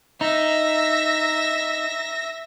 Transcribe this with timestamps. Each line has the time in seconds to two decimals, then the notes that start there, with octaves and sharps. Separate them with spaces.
0.21 D#4 E5 A#6